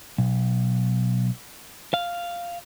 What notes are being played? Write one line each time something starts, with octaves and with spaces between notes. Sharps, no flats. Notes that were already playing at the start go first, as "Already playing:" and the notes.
B1
F5